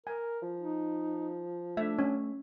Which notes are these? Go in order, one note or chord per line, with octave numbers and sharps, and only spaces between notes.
A#4 G#5
F3
D#4
A3 D4 E5
C#4